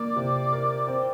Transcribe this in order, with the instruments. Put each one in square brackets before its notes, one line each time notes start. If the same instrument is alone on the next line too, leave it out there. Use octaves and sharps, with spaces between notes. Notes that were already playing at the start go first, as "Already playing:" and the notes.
Already playing: [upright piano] A#3 [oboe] D5
[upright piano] C3
A#4
C4